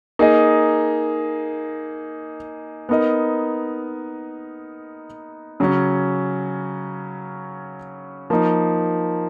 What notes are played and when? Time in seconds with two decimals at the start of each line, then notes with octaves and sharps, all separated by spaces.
0.19 A#3 D#4 G#4 D#5
2.89 B3 D#4 A#4 D#5
5.60 C#3 F#3 C#4
8.30 F3 A#3 D#4